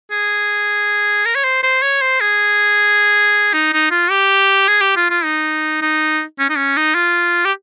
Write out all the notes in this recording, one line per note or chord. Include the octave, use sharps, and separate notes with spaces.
G#4
A#4
C#5
C5
C5
C#5
C5
G#4
D#4
D#4
F4
G4
G#4
G4
F4
F4
D#4
D#4
C#4
D#4
C#4
D#4
F4
G4